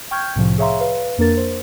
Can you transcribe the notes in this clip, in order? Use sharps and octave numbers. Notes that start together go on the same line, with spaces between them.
G5 C#6 F6 G6 G#6
C2 A2 C3 F3
G#4 C#5 E5 F5 A#5 C6
B4 F5
F2 A#3 D4 A#4 A6
C5